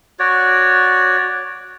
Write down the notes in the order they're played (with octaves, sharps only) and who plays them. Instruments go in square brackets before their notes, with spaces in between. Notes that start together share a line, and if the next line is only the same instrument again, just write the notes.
[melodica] F#4 C#5 D5